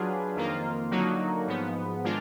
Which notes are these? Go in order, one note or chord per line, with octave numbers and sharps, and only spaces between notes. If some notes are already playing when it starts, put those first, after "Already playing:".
Already playing: F#3 D4 F4 G#4 B4
F2 D#3 A#3 F4
D3 F#3 A#3 D#4 F#4
G#2 F3 B3
D#3 G#3 D4 F4